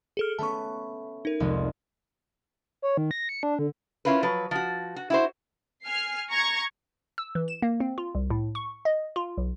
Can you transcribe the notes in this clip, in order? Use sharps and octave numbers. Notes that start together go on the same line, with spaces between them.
G#4 A4 F6
A3 B3 C#4 A5 C#6
D#4 A#4
F1 C2 G#3
C#5
D#3
A#6
C#7
D4
D3
C#4 E4 F4 A#4 B4
F3 F#3 B4
F3 F#4
F#4
E4 F#4 C5
G#5 F6 C7
A#5 C#6 G#6 A#6
E6
E3
E7
A#3
C4
F4
C2
A2
C#6
D#5
F4
B1